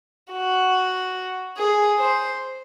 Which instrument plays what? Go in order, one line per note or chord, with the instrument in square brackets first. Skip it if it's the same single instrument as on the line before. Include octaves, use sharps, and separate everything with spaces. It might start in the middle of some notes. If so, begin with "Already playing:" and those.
[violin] F#4
G#4
C5